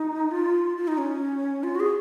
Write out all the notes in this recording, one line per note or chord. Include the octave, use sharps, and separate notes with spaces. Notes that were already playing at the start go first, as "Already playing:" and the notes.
Already playing: D#4
F4
F4
D#4
C#4
F4
F#4
G#4